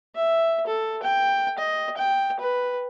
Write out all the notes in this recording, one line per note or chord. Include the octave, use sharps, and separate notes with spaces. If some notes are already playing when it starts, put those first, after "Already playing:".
E5
A4
G5
D#5
G5
B4